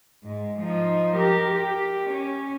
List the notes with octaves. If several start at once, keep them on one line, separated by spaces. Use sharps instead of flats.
G#2 G#3
F3 D#4
G4 A#4
G4
C#4